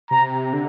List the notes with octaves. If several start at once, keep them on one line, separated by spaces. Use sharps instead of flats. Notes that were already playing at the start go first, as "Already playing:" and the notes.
C3 A#5
D3